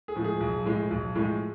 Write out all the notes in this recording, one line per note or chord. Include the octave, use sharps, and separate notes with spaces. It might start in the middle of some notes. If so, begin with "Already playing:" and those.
G#4
A2 F3 G#3
G#4
B1
A2 F3 G#3
B1
A2 F3 G#3